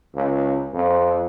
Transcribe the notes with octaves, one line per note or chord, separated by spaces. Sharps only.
C#2
F2